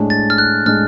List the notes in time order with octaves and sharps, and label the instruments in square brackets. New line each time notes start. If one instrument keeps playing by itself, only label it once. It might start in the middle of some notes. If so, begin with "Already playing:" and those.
Already playing: [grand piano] A2 G#3 D4
[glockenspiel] A6
F6
F#6
[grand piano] A2 G#3 D4 [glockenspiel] F6